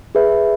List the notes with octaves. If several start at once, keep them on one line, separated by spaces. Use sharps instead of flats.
G#4 B4 E5